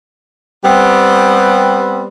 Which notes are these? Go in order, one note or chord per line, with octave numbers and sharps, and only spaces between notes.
G3 B3 C4 G4